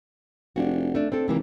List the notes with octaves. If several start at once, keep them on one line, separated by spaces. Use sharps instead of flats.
F1 D4 F#4
A3 D4
C4 D4 A4
G#1 C3 E3 A#3